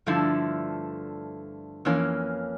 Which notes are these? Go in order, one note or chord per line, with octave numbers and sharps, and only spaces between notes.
G2 D3 F3 A3 E4
F2 E3 A#3 C#4